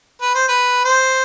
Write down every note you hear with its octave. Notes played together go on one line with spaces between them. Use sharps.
B4
C5
B4
C5